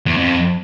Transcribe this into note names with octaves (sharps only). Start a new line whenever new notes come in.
E2
F2